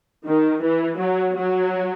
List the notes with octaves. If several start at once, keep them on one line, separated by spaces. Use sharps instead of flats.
D#3
E3
F#3
F#3